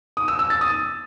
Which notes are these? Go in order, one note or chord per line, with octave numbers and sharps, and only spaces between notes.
D#6
E6
E6
A6
D#6